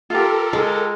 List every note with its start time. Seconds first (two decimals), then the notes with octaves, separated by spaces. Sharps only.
0.10 F4 G4 A4 A#4
0.53 G#3